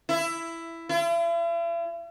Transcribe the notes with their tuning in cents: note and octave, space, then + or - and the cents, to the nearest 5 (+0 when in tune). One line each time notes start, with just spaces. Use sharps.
E4 +10
E4 +45